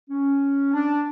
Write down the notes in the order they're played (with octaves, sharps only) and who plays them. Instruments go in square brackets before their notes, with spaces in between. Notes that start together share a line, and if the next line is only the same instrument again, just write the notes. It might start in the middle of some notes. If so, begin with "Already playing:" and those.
[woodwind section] C#4
D4